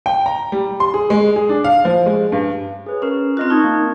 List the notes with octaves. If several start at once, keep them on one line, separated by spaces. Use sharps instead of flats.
G5
A#5
G3
C6
G#4
G#3
G#4
D4
F5
F3
G#3
G2
G#4 B4 C#5
C#4 G#4 A#4
C4 F4 A#4 D#5 F#6
D#4 A5 C#6 G#6
A#3